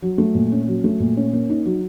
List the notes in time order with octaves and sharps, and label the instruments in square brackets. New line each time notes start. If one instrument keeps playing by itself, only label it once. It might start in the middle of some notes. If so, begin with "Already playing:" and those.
[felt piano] F#3
A3
A#2
C#4
F#3
A3
A#2
C#4
A#3
D#4
F#3